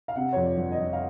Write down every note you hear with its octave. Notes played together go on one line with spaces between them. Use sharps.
F5
C3 F#5
F2 C#5
D5
G1
D#5
G1
F5